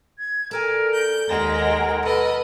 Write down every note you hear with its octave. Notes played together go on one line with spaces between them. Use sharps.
G#6
A4 A#4 D5 G#5
G6
D#2 G#3 A#4 F#5 A#5 A#6
B2 A4 B4 D#5